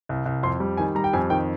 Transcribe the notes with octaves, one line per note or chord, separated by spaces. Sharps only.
C2
C2
F2 C6
G3
D#3 G#5
G3 A#5
G5
F2 G#5
D#3 G5